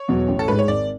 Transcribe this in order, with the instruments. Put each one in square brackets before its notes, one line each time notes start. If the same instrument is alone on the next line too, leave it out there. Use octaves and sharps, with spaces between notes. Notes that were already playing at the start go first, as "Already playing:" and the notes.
Already playing: [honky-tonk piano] C#5
[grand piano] E2 B2 F#3
A1
[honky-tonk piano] A4
[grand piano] G#2 G#3 [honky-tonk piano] B4
[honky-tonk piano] C#5
[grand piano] G#1 [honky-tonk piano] D5